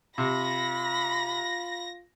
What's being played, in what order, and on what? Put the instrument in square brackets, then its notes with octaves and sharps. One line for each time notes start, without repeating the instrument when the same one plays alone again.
[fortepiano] C3 [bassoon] F4 [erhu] B5 [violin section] A#6